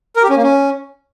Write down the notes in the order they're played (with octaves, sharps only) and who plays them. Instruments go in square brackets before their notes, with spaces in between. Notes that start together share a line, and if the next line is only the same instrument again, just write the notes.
[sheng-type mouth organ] A#4
G4
C#4
A#3
C#4